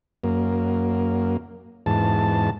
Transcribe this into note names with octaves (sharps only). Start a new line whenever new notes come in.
F#2 A#3
E2 G#2 A5